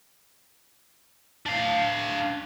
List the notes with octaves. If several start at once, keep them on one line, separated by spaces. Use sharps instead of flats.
D4 F5